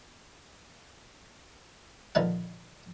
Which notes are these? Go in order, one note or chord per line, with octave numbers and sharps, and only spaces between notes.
A#1 D3 D#3 B4 F#5